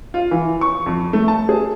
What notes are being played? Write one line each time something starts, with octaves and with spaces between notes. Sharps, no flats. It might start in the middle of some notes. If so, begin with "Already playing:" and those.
F4
E3
C#6
F2
A3
A5
G#4